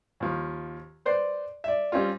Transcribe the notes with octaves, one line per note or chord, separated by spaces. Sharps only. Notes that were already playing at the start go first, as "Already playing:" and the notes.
D#2 F3
B4 C5 D5
D5 E5
G3 C4 C#4 F4